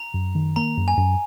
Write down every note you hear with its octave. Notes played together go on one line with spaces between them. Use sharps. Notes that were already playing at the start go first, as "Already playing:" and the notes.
Already playing: A#5
F#2
D#3
A#3 A#5
F#2
G#5
F#2